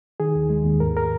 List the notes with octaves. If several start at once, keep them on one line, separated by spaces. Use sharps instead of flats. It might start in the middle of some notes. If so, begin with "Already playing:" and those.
D#3 G#4
D#2
G#3
D#2
G#2 A#4
A#4